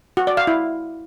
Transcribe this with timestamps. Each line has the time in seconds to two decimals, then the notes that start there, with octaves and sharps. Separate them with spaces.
0.17 F#4
0.27 D5
0.37 F5
0.47 E4